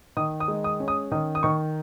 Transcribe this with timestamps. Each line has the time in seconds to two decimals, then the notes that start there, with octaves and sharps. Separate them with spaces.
0.17 D#3 D#6
0.40 D#6
0.48 G#3
0.64 D#6
0.80 C#4
0.88 D#6
1.12 D#3 D#6
1.35 D#6
1.43 D#3 C#6